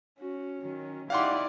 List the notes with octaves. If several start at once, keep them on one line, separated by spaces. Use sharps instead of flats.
C#4 F#4
D#3 F#3
D#4 E4 G4 D5 F5 F#5 C6